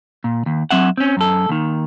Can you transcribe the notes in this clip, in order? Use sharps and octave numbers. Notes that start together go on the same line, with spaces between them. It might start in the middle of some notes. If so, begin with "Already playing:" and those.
A#2
D#2
F#3 C4 E5 F#5
C4 C#4
F#2 A4
D#2 D#3